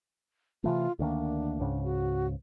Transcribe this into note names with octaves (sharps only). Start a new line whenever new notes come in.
C3 E3 A3 F4
D2 D#3 A#3 D4
C#2 G#2 C#3
F#4